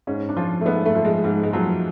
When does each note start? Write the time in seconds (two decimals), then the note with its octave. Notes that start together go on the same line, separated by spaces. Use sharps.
0.07 G#2 C#4
0.29 D4
0.36 F3 F4
0.61 A3
0.65 G#2 B3
0.85 A3
0.95 F3
1.05 G#3
1.24 G#2 G#3
1.43 G#3
1.53 F3 F#3